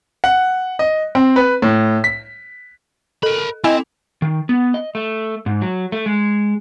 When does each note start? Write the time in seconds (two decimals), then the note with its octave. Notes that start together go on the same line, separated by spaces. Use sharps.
0.24 F#5
0.79 D#5
1.15 C4
1.36 B4
1.62 A2
2.04 B6
3.23 A4 A#4 B5
3.64 C4 E4 D#5 G#5
4.22 D#3
4.49 B3
4.74 D#5
4.95 A3
5.46 G#2
5.62 F#3
5.92 A3
6.06 G#3